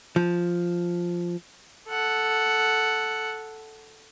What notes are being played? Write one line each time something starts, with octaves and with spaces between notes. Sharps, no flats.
F3
A4 F#5